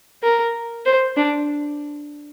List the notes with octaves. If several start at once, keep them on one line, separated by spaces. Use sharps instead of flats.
A#4
C5
D4